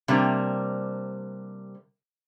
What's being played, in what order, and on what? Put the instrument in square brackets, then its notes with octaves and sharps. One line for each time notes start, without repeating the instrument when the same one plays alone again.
[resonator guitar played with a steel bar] C3 G3 A#3 D4 A#5